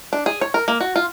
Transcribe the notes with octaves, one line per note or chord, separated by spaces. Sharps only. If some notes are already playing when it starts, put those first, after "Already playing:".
D4
G#4
C#5
A#4
A#3
F#4
F4